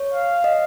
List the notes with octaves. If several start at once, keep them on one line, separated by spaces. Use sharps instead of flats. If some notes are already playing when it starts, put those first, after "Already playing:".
Already playing: C#5
F5
D#5